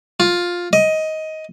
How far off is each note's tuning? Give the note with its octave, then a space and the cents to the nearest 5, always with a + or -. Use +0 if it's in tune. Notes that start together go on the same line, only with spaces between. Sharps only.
F4 +10
D#5 +15